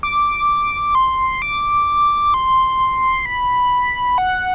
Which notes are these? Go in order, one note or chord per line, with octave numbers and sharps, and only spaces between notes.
D6
C6
D6
C6
B5
F#5